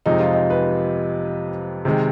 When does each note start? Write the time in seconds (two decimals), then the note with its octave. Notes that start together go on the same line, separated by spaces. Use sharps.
0.06 F2 C3 F3 G#3 D#4
0.20 F4
0.33 D#4
0.50 B4
1.85 C3 D#3 G#3